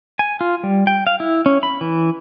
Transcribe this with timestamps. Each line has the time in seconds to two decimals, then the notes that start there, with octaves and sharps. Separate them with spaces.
0.19 G#5
0.41 F4
0.63 G3
0.87 G5
1.07 F5
1.20 E4
1.46 C#4
1.63 B5
1.81 E3